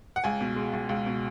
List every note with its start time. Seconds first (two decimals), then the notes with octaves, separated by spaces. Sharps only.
0.16 F#5
0.24 C#2 G#5
0.41 B2
0.56 G#3
0.73 C#2
0.89 C#2
1.06 B2